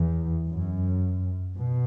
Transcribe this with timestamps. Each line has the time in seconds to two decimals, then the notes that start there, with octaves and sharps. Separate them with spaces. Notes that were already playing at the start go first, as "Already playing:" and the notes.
Already playing: E2
0.48 F#2
1.56 B2